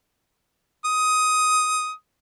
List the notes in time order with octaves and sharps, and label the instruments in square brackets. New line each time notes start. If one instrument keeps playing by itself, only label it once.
[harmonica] D#6